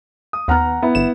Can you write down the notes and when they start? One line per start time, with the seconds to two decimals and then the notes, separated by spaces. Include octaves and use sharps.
0.33 D#6
0.48 D#2 B3 F#5 A#5 F6
0.82 B3 E4
0.95 G1 E7